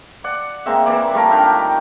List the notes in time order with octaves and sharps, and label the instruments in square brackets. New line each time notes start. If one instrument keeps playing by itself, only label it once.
[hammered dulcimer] D5 F#5
G#3 A#3 C4 E5
E3 A#3 D5
G3 A3 F4 A#4
D#3 D4 G4 F5